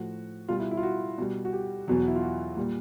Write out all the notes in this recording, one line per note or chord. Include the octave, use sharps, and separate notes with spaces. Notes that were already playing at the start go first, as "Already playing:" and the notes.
Already playing: A2 F3 F#4
B2 G3 F4
E4
E4
F4
F#4
B2 G3
F#4
G4
E2 B2 F#3
E4
F4
F#4
A#2 G3